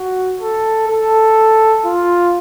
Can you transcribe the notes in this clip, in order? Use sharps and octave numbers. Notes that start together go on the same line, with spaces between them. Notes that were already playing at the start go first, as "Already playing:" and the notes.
Already playing: F#4
A4
A4
F4